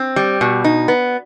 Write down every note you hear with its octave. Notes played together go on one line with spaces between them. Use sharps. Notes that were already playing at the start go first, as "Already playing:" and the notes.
Already playing: C4
G3
B2
D#4
B3